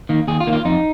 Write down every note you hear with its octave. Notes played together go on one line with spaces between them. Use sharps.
D#3 A#3
D#2 G#4
F4
D#3 A#3
F4
F2 D#4